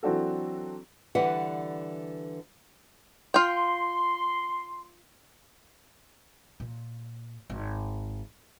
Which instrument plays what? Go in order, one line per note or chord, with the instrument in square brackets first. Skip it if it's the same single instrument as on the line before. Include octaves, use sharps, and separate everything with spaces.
[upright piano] E3 F#3 C4 D4 F#4 A4
[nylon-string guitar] D3 E3 G3 B4 F#5
[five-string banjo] F4 G5 [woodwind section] C6
[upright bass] A#2
G#1